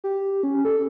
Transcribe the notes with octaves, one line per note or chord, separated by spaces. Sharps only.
G4
C#4
A4